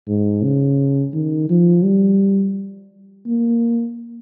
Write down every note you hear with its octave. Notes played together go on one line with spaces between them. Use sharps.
G#2
C#3
D#3
F3
G3
A#3